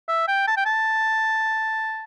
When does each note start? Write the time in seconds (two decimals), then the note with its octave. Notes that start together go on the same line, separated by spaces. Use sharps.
0.08 E5
0.28 G5
0.47 A5
0.57 G5
0.65 A5